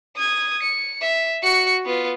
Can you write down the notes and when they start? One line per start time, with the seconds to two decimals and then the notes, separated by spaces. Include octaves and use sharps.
0.16 D#6 G#6
0.63 C#7
1.01 E5
1.43 F#4 C#7
1.85 B3 F4